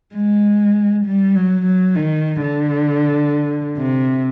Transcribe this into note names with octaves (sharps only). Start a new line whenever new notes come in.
G#3
G3
F#3
F#3
D#3
D3
C3